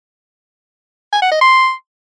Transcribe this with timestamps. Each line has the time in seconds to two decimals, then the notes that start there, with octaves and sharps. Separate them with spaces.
1.13 G#5
1.22 F#5
1.32 D#5
1.41 C6